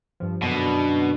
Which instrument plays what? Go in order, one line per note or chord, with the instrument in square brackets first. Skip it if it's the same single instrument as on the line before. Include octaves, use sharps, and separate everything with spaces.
[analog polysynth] G2 F3
[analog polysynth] F#2 D3 D4 [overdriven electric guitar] B2